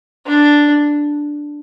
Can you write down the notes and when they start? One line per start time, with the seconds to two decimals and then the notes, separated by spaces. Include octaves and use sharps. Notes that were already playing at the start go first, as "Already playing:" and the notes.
0.27 D4